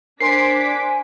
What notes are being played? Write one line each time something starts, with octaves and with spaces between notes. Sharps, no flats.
D4 A#4 C5 G#5 C6 D6 B6 C7